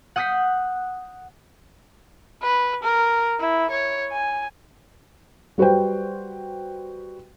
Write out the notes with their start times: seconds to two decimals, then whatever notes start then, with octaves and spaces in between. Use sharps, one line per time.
0.16 F#5 D#6 F#6 G6 B6 C7
2.42 B4
2.83 A#4
3.40 E4
3.71 C#5
4.13 G#5
5.58 G3 F#4 B4 C5 G5